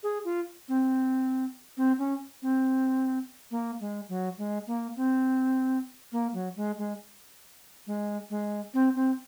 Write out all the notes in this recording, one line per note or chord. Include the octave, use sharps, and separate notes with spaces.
G#4
F4
C4
C4
C#4
C4
A#3
G#3
F#3
G#3
A#3
C4
A#3
F#3
G#3
G#3
G#3
G#3
C4
C4